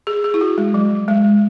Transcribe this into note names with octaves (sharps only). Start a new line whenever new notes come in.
G#4
G#4
E4
F#4
G#3
F#3
G#3